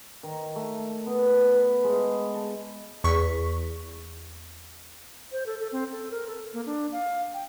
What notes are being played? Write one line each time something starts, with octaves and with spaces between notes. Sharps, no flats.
D#3
A3
B3
B4
G#3
A5
E2 C#6 B6
C5
A4
A4
C4
A4
A#4
A4
A#3
D4
F5
G5